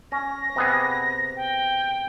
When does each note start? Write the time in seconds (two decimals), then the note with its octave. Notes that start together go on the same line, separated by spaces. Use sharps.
0.12 C#4 A#6
0.56 C3 B3 G#4
1.36 G5